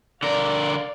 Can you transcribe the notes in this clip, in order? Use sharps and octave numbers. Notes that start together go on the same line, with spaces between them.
D3 A#4 D5 F5